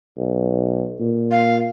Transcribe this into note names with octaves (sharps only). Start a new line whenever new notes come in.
B1
A#2
F5